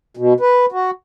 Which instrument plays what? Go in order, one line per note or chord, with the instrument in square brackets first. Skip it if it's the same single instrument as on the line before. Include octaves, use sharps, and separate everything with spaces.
[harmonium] B2
B4
F#4